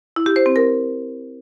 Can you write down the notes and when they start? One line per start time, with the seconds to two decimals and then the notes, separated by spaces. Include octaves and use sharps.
0.16 E4
0.26 G4
0.36 C5
0.46 C4
0.56 A#4